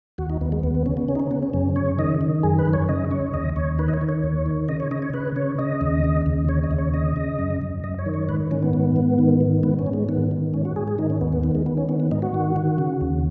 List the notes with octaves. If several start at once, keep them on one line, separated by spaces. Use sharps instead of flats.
D#2 F#4
D#4
D#2 B3
G#3
D#2 B3
B3
C#3 C#4
B3
C#3 C#4
D#4
C#4
C#3 B3
C#4
F#2 C#4
C#3 C#5
D#3 D#5
D#3
F#2 G#4
B4
F#2
C#5
C#3 D#5
C#3 C#5
D#2 D#5
D#2 C#5
D#3 B4
D#5
C#5
D#3
C#5
D#2
D#3
C#3 D#5
C#5
C#3 D#5
C#5
C#3 B4
C#3 C#5
C#3 D#5
D#2
C#3
D#2
C#3 C#5
D#5
D#2
C#5
C#3 D#5
C#3
F#2
F#2
F#2 D#5
C#5
D#3
C#5
G#2 B4
D#3 C#4
B3
G#2
G#2
D#3
D#3
G#2 B3
C#4
G#2
G#3
D#3 B3
D#3
G#2 C#4
F#4
G#2 G#4
G#4
D#3 D#4
C#4
D#2 B3
B3
D#3 B3
G#3
D#3 B3
C#4
D#3 B3
B3
G#2 D#4
F#4
D#3
D#3
C#3
D#2